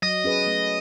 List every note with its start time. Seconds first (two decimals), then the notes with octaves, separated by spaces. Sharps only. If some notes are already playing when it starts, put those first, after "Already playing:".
0.02 F#3 D#5
0.24 C#4 G#4 B4
0.47 A3